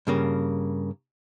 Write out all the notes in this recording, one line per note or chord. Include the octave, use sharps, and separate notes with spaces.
G2 C#3 A#3